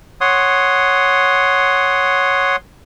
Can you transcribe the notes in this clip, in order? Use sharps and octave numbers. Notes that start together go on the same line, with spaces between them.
C#5 F#5 C6 D#6